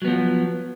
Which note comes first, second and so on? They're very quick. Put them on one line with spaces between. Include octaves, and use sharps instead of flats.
F#3 B3 F3